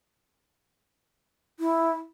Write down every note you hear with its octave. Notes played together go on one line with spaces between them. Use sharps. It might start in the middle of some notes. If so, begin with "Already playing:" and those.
E4